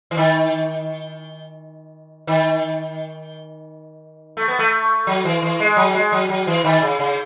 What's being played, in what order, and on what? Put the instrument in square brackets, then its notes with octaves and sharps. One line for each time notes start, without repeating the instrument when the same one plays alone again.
[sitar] E3
D#3
D#3
A3
B3
A3
F#3
E3
E3
G#3
F#3
G#3
F#3
F#3
E3
D#3
C#3
C#3